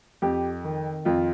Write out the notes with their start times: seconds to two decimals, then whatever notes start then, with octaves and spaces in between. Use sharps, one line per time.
0.22 F2 G4
0.64 D#3
1.05 F2 F4